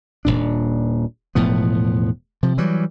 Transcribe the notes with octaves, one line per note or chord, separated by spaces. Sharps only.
D#1 C2 A#2 D4
E1 A2 F3 B3
C3 F3
E3 F#3 G3